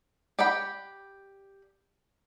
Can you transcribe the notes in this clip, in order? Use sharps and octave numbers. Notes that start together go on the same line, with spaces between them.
G4 D5 F#5 G5 B5